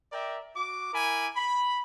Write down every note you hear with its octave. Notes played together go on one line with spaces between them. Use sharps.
A#4 D5 E5 G5 A#5
F#4 D6
E4 A#4 G#5 B5 D6
B5